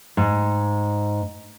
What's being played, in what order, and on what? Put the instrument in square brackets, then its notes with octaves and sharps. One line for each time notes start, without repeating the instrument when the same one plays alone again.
[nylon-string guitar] G#2